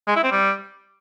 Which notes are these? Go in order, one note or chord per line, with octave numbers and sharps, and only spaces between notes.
G#3
E4
C4
G3